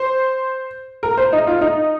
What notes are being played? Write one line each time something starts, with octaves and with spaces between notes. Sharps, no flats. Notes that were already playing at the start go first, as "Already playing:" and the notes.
Already playing: C5
A#4
C5
D#4
F4
D#4